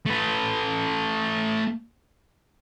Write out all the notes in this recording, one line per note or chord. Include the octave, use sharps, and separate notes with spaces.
A3 B4